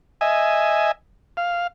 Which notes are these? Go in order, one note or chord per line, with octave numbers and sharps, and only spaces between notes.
D#5 E5 G#5
F5